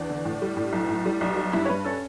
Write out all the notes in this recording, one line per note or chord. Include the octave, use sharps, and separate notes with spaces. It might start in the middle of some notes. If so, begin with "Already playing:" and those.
Already playing: E2 D4
D3
A2
G3
A2
B1
A2
G3
B1
G3
G2 E4 E5
C#5
G2 B4
C#4 A4